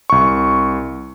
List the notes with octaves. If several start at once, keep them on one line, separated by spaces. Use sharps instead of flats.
C2 C#6